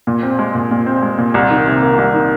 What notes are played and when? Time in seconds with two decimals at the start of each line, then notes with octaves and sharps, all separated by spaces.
0.07 A#2
0.23 C4
0.39 G#3
0.55 A#2
0.71 A#2
0.86 C4
1.02 G#3
1.18 A#2
1.34 C2
1.51 D#3
1.67 C3
1.83 A#3
1.98 C2
2.14 D#3